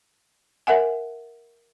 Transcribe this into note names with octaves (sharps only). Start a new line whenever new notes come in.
A#4 E5 F#5 G#5